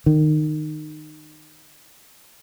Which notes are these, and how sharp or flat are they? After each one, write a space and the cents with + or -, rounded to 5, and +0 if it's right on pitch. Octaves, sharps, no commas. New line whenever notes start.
D#3 -20